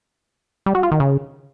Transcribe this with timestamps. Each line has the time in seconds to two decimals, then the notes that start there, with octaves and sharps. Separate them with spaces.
0.66 G3
0.75 F#4
0.83 F4
0.92 D#3
1.00 C#3